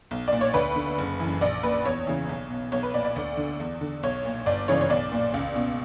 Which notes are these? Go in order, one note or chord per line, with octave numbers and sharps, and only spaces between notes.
B1
A#2 D5
C#5
D2 B4
D3
F#1
F#2 E3
A#1 D5
A#2 B4
E2 C#5
C#3 E3
B1
B2
B1 C#5
B4
A#2 D5
D5
D2
D3
E2
D3
B1 C#5
A#2
G1 D5
F#2 C#3 E3 C#5
C#5
B1 D5
A#2
C#2
B2